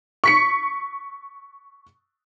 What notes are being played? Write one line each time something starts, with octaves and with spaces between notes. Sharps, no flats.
C#6 B6 C#7